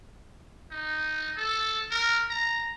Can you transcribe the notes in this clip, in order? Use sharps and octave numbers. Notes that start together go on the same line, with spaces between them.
D#4
A4
A#4
A#5